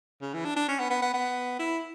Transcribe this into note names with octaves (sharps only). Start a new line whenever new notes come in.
C#3
E3
D4
D4
C#4
B3
B3
B3
B3
E4